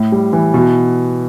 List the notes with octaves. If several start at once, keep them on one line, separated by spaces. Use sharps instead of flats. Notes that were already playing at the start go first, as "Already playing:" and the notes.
Already playing: A2
G3
E3
B2